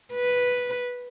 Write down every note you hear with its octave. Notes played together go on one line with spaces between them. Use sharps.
B4